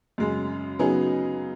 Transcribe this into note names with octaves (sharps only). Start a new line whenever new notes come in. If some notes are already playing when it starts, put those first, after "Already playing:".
F#2 C#3 G#3
C#3 F#3 B3 D#4 G#4